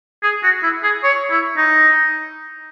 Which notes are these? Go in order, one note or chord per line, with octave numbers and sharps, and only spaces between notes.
G#4
F#4
E4
G#4
C#5
E4
D#4